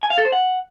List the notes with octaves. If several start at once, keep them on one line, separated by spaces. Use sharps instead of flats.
G#5
F5
A4
C5
F#5